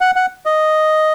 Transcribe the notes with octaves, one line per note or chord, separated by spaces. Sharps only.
F#5
F#5
D#5